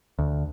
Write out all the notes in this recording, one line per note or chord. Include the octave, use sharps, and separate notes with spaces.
D2